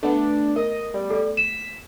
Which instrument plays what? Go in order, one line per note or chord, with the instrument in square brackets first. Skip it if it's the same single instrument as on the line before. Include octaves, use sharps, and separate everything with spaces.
[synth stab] A3 B3 [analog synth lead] D4
[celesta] A#4 [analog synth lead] D#5
[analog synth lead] G3
[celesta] A4 D5
[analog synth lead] B6 [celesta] E7